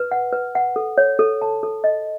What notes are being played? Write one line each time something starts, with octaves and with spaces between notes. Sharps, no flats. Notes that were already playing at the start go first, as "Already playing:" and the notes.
Already playing: B4
F#5
B4
F#5
A4
C#5
A4
A5
A4
D#5